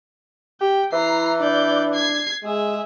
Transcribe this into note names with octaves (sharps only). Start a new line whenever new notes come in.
G4 G5
E3 E4 A#5 C7
D4 D5 G6
G#6 C7
G#3 G#4 E5